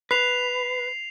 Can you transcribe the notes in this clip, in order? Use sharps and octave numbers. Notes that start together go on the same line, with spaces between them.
B4 C7 F7